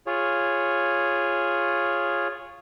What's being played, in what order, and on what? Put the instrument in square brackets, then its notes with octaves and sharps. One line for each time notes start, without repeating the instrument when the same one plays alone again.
[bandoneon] F4 G#4 C#5